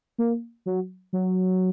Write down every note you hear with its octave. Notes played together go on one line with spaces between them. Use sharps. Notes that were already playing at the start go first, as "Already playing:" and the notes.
A#3
F#3
F#3